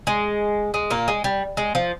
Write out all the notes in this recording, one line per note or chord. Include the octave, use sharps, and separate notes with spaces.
G#3
G#3
A#2 A#3
G#3
G3
G#3
F3